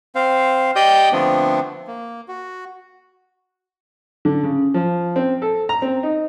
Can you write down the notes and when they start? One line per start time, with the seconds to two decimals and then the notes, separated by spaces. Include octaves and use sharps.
0.15 C4 C5 F5
0.76 G4 D5 D#5 G5 D#6 G6
1.12 D3 F3 A3 B3 C4 D4
1.87 A#3
2.28 F#4
4.25 D3
4.43 C#3
4.74 F3
5.16 C4
5.42 A4
5.69 A#5
5.82 C4
6.03 D#4